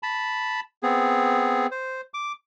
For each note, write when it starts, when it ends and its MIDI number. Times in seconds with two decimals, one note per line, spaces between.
0.03 0.60 81
0.03 0.60 83
0.83 1.67 59
0.83 1.67 60
0.83 1.67 68
1.71 2.01 72
2.14 2.32 86